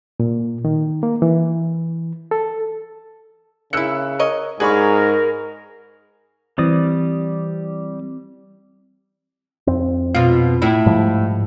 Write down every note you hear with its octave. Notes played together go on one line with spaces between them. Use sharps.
A#2
D#3
A#3
E3
A4
C#3 A#3 E4 E6 F#6 C#7
A#4 C#5 D#5
G#2 F#4 G#4 A#4 D5 B5 C#6
E3 G3 C4 D5 D#6
F2 C4
B2 F4
A2 E4
G#2 F3 G3